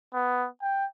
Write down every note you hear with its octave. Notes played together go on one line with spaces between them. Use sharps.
B3
G5